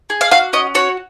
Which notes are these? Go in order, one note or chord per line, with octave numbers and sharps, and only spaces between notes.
G#4
F5
F#4 F5
C#4 D#5
F#4 C#5